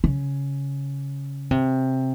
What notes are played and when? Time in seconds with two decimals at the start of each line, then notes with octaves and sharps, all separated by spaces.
0.04 C#3
1.51 C3